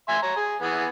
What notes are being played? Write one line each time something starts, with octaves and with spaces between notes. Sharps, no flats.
E5 G#5 C6
C#5 A#5
G#4
E3 B3 G#4